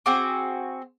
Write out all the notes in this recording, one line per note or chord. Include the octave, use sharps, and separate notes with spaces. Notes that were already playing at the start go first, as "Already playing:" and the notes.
C4 F#4 G#4 D6